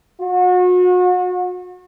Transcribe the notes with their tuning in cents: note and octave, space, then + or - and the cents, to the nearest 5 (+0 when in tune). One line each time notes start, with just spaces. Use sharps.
F#4 -35